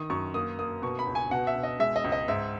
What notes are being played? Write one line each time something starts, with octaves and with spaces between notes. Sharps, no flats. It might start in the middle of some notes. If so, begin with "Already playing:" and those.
Already playing: D#3 D#6
F#2 C#6
A#3 D#6
A#3 D#6
B2 C#6
B5
C#2
G#5
B2 F#5
E5
B2
D#5
G#3 E5
D#5
C#2
D#5
G#2 E5